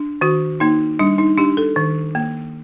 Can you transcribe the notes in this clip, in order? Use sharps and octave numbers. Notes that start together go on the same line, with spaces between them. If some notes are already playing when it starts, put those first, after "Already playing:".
Already playing: D4
D#3 F#4
A#3 D#4
G3 D4
D#4
D4 G4
A4
D#3
A#3